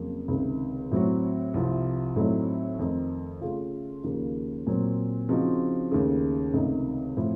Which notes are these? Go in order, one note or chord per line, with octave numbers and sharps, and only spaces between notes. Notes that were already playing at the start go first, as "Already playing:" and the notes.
Already playing: F2 C#3 F#3 A#3
C#2 C3 D#3
A2 F#3 C4 F#4
C2 C3 F3
A2 F#3 A3 C4 D#4
F2 D#3 A3 C4 D#4
C#3 A3 C#4 F4
D#2 C#3 F3 A#3 F4
A#2 F#3 C4
C#3 F3 C4 D#4 F#4
D#2 C#3 A3
C#2 C3 D#3 A3 D#4
A2 F3 C4